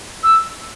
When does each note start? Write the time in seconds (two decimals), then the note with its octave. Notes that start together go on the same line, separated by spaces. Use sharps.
0.23 E6